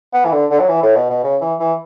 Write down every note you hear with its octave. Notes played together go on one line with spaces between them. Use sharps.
B3
E3
D3
D3
F#3
E3
A2
B2
B2
C#3
E3
E3